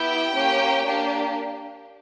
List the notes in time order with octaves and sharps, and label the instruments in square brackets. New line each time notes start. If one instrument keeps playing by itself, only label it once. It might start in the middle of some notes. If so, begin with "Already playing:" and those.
Already playing: [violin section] B3 E4 G4 G5
A#3 C#4 G4
A#3 D4 G4